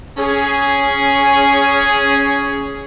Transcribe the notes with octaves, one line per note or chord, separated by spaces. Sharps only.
C#4 G#4